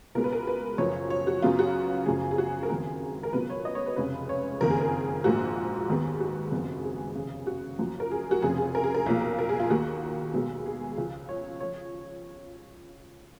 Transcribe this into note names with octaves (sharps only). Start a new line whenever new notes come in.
C#2 B2 G#3 B3 A#4
B4
A#4
B4
F#1 F#2 F3 C#5
C#5
F#4
F#2 C#3 F#3 B3 F4
F#4
F#1 F#2 C#3 F3 G#4
G#4
F#4
A#4
F#1 F2 D#3 G#3 B3 G#4
A#4
C#2 B2 F#3 B3 B4
C#5
D#5
C#5
B4
F1 F2 C#3 G#3 B4
C#5
F#1 F2 D#3 A#3 A#4
G#4
A#4
A#1 G#2 F3 A#3 F#4
D#2 D#3 G#3 B3
F#4
F#1 F2 D#3 G#3 B3
G#4
F1 D#2 C#3
F#4
F#2 F3 A#3
A#4
G#4
F#4
F1 F2 C#3 G#4
G#4
A#4
G#4
A#4
B1 A#2 F3 A#3
A#4
G#4
F4
D#2 D#3 A#3 F#4
B1 B2 G#3 B3
G#4
C#2 C#3 F3
C#5
F3 C#5